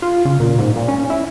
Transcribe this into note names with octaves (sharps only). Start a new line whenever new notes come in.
F4
C#3
A#2
G#2
A#2
C#4
E4